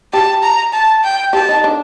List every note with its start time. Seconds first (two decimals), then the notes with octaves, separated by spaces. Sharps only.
0.13 G4 A5
0.43 A#5
0.73 A5
1.04 G5
1.33 G4 A5
1.49 D#4
1.64 D4